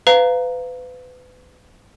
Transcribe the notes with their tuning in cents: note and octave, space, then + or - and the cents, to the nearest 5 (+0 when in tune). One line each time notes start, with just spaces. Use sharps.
B4 +30 F5 +0 A#5 +0